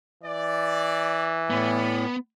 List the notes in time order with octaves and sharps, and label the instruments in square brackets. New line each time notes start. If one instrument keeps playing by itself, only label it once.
[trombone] E3 [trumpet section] D5
[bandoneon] A2 [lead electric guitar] B3 [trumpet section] D5 G#5 B5